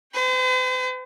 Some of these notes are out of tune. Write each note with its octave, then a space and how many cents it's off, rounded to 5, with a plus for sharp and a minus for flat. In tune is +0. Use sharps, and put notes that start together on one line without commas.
C5 -45 G5 +25